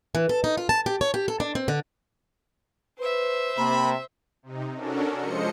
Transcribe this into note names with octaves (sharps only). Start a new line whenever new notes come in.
E3
A4
D#4
F4
A5
G4
C#5
G4
A4
D4
C4
D3
B4 C5 E5
C3 A#3 B5
C3 D#4
C#4 D4 F#4 A4 A#4
F3 G#3 C5 D#5 C#7